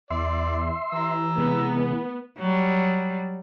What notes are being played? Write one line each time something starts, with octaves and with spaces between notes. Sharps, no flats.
E2 D5 E5 C6
E3 A#5 E6
C3 G#3 B3
F#3 G3